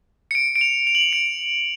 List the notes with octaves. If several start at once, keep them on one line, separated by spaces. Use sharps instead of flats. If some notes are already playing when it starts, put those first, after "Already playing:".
C#7
D7
D7
F7
F7
F#7
F7
D7